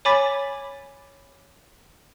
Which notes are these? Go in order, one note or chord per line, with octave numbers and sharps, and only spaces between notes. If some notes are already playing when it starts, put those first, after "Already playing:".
C#5 G#5 B5 D6 A6 B6